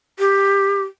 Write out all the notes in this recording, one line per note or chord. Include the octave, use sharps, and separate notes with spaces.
G4